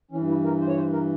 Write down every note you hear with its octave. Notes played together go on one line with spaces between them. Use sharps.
G2 E3 C#4
E4
A#4
C5
C#5
C5
A#4